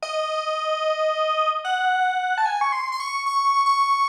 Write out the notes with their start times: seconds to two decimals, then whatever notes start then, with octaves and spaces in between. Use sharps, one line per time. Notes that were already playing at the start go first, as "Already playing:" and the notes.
0.03 D#5
1.65 F#5
2.38 A5
2.46 G#5
2.61 C#6
2.72 C6
2.92 C6
3.00 C#6
3.26 C#6
3.66 C#6